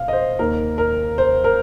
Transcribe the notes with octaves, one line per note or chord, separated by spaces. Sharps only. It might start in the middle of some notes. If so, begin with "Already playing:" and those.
Already playing: A#2 F5
D#5
C5
D#2 D#3 A#3 A#4
A#4
C5
A#4